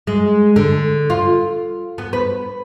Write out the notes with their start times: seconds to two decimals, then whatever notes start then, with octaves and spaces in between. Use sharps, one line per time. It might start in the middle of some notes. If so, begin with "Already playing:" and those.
0.07 G#3
0.56 D3
1.10 F4
1.98 B3
2.13 B4